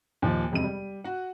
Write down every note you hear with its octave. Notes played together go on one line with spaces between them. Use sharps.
D#2 A#2 F3
E1 F2 C3 D#7
G3
F#4 F#5